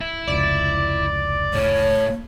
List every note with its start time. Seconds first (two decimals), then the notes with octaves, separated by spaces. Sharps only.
0.01 E4
0.27 F1 C#2 D5
1.54 A2 C#5